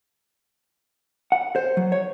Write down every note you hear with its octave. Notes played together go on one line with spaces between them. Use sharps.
F#5
C5
F#3
C#5